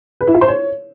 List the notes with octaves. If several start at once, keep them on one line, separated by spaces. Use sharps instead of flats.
B4
E4
F4
C5
C#5